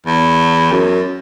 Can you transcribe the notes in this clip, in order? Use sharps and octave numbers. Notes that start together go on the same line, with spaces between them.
E2
F#2